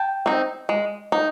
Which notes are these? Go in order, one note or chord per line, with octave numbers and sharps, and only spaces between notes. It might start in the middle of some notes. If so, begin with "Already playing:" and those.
Already playing: G5 A5
C4 D#4
G#3
D#4